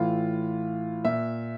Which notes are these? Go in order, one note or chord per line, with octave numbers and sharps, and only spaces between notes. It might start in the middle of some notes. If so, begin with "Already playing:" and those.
Already playing: A2 E3 F4
A#2 E5